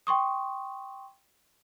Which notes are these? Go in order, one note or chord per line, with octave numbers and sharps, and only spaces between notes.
G5 C6 C#6 D#6